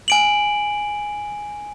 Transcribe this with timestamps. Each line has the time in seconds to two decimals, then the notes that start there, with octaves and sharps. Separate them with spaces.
0.08 G#5 D7 F#7